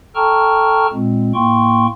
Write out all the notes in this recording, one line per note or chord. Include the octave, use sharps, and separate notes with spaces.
A4 G5 A5 A#5 C#6 F6
A#2 G#3 C4
A2 A#3 G5 C6 C#6